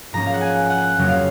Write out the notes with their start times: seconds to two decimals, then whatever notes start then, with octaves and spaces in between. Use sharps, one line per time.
0.13 G#2 F3 A#3 C#4 A#5
0.26 F5
0.34 F#5
0.41 G#5
0.70 F#5
0.98 F2 C#3 F#3 A#3 C#4
1.08 F5